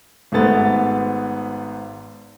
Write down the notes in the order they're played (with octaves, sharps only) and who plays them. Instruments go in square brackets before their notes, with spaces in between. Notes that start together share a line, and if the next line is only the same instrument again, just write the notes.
[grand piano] G#1 G#2 A3 B3 A6